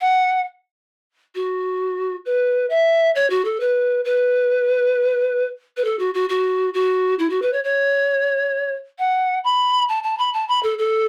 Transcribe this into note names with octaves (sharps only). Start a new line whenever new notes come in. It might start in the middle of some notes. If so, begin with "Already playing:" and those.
F#5
F#4
B4
E5
C#5
F#4
A4
B4
B4
B4
A4
F#4
F#4
F#4
F#4
E4
F#4
B4
C#5
C#5
F#5
B5
A5
A5
B5
A5
B5
A4
A4